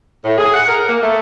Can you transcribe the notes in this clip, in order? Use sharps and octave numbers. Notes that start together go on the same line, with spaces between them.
A2
G#4
F#5
A#4
A#3
A3